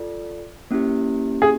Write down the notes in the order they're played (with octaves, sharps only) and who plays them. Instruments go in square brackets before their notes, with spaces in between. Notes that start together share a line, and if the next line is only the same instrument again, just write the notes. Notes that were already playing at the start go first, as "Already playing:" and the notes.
Already playing: [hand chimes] F4 A4 D5
A#3 C#4 E4 G4
[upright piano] G#4